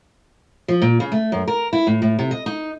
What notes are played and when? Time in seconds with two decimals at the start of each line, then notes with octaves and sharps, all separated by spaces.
0.68 F3
0.82 A#2
1.00 C#3
1.12 A3
1.32 F#2
1.47 A#4
1.73 E4
1.87 A2
2.02 A2
2.19 C3
2.31 D#5
2.46 D#4